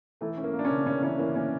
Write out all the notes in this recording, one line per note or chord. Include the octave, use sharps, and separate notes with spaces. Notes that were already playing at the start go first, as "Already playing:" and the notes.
E3 A3
C#4
A#3
A#3
D4
C#4
C#3
C#3 C#4
E3 C#4
E3 A#3
A#3 C#4